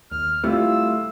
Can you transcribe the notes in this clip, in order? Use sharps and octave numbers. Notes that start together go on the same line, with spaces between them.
D#2 F6
C3 G3 A3 E4 F4 E6